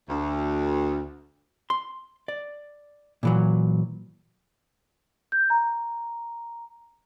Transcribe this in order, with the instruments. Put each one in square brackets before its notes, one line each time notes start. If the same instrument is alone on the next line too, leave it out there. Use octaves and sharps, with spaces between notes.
[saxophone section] D2
[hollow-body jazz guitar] C6
D5
A#2 E3 F#3
[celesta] G6
A#5